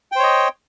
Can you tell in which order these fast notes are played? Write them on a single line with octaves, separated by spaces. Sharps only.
G5 C5 C#5 D#5